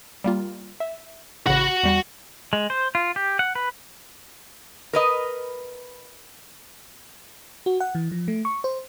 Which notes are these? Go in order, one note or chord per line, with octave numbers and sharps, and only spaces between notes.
G3 A#3 F4
E5
A1 C#3 F#4 F#5 B5
E2 G3
G#3
C5
F4
G4
F#5
B4
A#4 B4 D#5
F#4
F#5
E3
F3
A3
C#6
C5